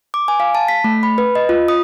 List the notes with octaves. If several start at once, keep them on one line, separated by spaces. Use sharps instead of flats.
D6
G#5
F5
A5
B6
A3
B5
B4
D#5
F4
D#6